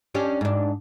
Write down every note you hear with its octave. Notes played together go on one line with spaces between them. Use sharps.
C#4 D4 G4
G#2 D4